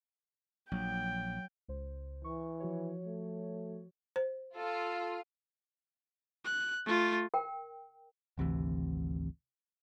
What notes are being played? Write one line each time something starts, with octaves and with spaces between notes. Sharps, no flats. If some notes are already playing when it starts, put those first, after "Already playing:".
A#1 F#3 G5
C#2 C5
E3 C#6
F3 F#4 C#5
A3
C5
F4 A4
F#6
A3 F4
A#4 G5
G#1 D2 C3 E3